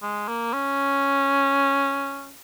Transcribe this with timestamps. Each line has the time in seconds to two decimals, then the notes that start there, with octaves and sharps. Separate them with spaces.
0.02 G#3
0.28 A#3
0.53 C#4